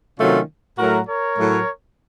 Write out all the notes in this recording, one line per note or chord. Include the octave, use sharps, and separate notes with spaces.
C3 D#3 F#3 A3 C#4 F4
A2 F#3 A3 F#4 A#4
A#4 C#5
A2 F#3 A3